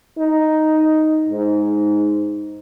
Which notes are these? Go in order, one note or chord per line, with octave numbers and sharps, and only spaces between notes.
D#4
G#2